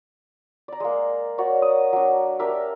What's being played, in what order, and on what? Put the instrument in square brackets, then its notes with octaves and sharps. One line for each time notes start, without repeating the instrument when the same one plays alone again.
[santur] D5 A#5
G#3 A#3
F#4 A#4 C#5 D5
D#6
F#3 D4
D4 G4 A#4 E5